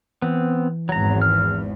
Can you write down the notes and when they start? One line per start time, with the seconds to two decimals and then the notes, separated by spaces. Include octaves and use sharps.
0.22 E3 B3 C4
0.89 G#1 E2 F#3 A#5
1.22 F6